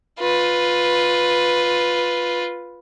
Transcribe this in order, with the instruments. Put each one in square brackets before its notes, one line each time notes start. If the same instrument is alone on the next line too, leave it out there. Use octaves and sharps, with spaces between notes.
[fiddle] F4 B4